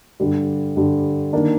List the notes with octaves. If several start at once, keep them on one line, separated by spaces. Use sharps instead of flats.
G2 D3 G3
G2 D3 G3
D#3 A#3 D4